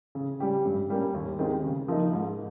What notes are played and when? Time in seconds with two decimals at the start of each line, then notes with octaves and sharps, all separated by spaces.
0.15 C#3
0.40 G3 C#4 G4
0.65 G2
0.90 G3 A#3 C#4
1.14 D#2
1.39 D#3 G#3 C4 D#4
1.64 C#3
1.88 F3 A#3 D#4
2.13 G#2